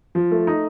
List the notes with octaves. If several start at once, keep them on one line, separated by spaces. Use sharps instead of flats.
F3
A3
D#4